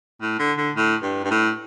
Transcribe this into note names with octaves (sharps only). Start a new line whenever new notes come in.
A2
D3
D3
A2
G2
G2
A2